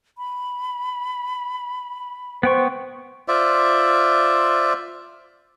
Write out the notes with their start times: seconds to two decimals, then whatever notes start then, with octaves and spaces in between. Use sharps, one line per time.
0.18 B5
2.43 B3 C5 G5 C#6
3.28 F4 C5 D5 E5